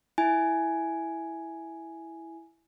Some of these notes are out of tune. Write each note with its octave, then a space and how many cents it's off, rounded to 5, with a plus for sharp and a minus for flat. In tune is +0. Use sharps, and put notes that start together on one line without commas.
E4 +0 G#5 +5